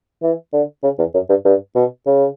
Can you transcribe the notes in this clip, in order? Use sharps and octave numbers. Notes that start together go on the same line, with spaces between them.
E3
D3
C#3
E2
F#2
G2
G2
B2
C#3